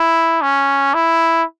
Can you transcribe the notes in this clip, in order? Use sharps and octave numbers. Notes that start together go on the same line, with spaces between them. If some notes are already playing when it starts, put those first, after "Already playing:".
Already playing: E4
C#4
E4